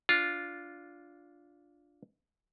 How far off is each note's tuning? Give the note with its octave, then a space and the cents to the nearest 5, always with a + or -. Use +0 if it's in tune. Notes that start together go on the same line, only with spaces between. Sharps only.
D4 -10 F4 +0